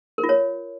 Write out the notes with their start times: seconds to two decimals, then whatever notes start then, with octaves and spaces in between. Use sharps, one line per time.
0.18 A#4
0.24 F4
0.29 C#5